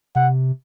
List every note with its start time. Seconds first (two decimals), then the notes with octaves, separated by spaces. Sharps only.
0.15 C3 F#5